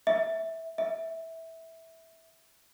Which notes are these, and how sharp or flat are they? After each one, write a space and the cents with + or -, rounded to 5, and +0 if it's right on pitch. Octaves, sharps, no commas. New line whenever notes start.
E5 -10
E5 -10